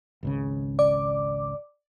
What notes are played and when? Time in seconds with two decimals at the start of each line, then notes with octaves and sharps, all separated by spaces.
0.23 G#1 C#2 C#3
0.79 D5 D6